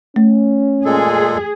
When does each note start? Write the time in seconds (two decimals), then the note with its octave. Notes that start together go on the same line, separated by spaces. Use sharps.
0.16 A3 C#4
0.85 A#2 G#3 G#4 A4